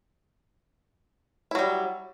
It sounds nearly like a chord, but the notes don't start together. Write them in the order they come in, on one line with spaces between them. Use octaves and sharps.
E4 F#3 G3